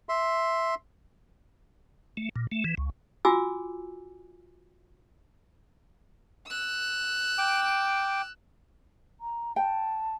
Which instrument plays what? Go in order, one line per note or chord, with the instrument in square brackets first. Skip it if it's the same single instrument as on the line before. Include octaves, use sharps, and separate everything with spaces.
[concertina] E5 C6
[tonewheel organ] A3
A#2
A3
E3
C#2
[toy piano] F4 F#4 G#5 D6 E6
[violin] E6 F#6
[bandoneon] G5 D6
[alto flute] A#5
[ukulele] G5 [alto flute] A5